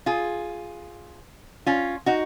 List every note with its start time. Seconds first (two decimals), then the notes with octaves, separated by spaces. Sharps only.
0.06 F4 G#4
1.66 C#4 F4
2.06 D#4 F#4